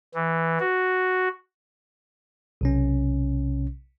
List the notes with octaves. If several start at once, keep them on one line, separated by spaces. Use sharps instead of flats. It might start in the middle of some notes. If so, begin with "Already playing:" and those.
E3
F#4
B1 C3 C#4